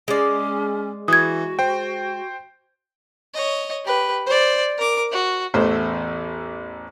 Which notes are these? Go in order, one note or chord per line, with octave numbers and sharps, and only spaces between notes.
G#3 C#4 D5
E3 F#4 D#6 G#6
C5 G5
C#5 D#5
G4 B4
C5 D5
A#4 D6
F#4
A1 E2 A3 C5 E5